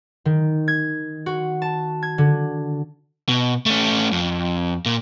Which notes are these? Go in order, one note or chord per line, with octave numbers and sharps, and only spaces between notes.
D#3
G#6
F#4
A5
G#6
D3
B2
A3 C#4
F2
A#2